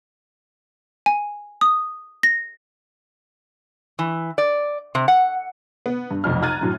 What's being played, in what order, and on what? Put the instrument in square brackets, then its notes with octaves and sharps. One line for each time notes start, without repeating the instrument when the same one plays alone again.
[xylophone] G#5
D#6
A#6
[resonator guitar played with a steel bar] E3
D5
C3
F#5
[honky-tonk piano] B3
G2
F1 B1 F2 F6
A#5 F6 F#6 G#6 A6 D#7
F#2 A2 F#3